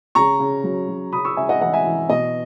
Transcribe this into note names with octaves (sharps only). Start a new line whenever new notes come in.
C#3 A#5 C#6
C#3
F#3
F#3
C#3 B5 D#6
C#6 E6
C#3 E5 G#5
D#5 F#5
E3 D#5 F#5
E5 G#5
E3
B2 D#5